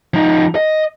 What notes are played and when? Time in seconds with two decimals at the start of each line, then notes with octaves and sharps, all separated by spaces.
0.14 F3 D#4
0.55 D#5